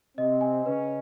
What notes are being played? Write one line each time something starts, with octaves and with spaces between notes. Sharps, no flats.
C3 C4 D#5
G#5
C#3 C#4 B4